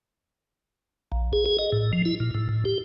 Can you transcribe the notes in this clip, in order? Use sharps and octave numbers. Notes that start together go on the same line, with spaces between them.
A#1
G#4
G#4
D#5
A2
F3
E4
A#2
A2
A2
G4